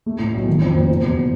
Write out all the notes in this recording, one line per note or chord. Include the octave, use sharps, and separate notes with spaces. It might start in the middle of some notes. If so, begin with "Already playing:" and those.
A3
A2
B1
D#3
F2
F#1
E2
B2